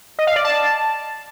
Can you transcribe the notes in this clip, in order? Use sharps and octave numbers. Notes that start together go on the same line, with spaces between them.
D#5
F5
D5
A5